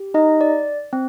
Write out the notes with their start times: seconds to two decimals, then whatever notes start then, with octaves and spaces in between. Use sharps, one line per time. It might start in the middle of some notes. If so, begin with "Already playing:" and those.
Already playing: G4
0.14 D#4 D#5
0.41 D5
0.93 C4